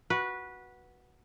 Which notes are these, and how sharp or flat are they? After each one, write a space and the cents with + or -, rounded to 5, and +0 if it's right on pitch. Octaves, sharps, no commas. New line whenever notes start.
F#4 +0 B4 -15